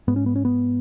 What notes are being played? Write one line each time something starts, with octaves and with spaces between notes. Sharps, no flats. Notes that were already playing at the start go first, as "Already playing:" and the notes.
G#2 B3
C#4
B3
C#4
B3